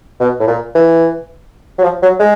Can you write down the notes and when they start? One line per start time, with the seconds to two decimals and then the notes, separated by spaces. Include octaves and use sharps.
0.20 B2
0.40 A2
0.47 A#2
0.75 E3
1.79 F#3
1.83 F3
2.03 F#3
2.20 G#3